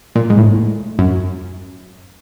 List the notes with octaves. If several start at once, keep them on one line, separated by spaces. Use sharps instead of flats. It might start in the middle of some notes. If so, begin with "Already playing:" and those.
A#2
G#2
A2
F#2